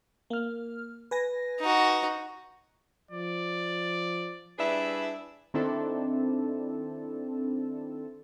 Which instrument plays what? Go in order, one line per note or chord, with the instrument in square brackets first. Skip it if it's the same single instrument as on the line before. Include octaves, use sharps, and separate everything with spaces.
[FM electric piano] A#3 F6
B4 G#5 A#6
[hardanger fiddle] D#4 F#4
[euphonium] F3 [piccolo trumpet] D5
[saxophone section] G3 D4 E4 G#4 B4 E5
[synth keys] D#3 C4 D4 E4 A4